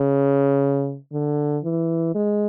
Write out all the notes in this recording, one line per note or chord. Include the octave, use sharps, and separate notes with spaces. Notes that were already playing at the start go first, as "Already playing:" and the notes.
Already playing: C#3
D3
E3
G#3